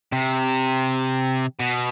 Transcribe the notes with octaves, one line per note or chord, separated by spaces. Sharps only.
C3
B2